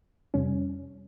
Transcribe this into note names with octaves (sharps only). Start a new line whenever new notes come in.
F2 C3 G3 C#4